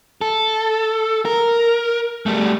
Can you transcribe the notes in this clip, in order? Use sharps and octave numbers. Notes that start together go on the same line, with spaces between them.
A4
A#4
G3 A3